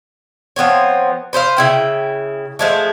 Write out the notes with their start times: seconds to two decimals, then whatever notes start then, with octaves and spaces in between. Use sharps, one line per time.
0.56 F3 B3 C4 C#5
1.33 B4 C5 D#5 F5
1.57 C#3 E4 G5
2.59 F3 G#3 A3